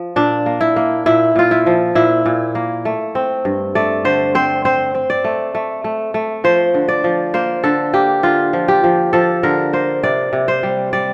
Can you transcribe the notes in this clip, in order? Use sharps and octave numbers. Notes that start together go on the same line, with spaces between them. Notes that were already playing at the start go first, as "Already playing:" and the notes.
Already playing: F3
A#2 D4
A#3
E4
A#3
A#2 E4
A#2 F4
E4
F3
A#2 E4
A#2
A#3
A3
C4
G2
A3 D5
D3 C5
C4 C5
C4 C5
C4
D5
A3
A3
A3
A3
F3 C5
D3
D5
F3
A#3 C5
D3 A4
A#3 G4
D3 F4
F3
G4
F3
F3 A4
D3 A#4
A#3 C5
C3 D5
C3
C5
G3
G3 D5